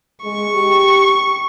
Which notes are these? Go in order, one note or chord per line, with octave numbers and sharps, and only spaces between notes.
G#3 C#6
G4